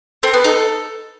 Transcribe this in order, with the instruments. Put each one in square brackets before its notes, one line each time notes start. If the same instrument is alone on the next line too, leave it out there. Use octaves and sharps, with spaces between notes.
[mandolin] C4 [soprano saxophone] A4
[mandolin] B3
[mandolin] D#4 [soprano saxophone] A4